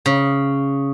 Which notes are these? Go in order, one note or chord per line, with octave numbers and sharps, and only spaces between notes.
C#3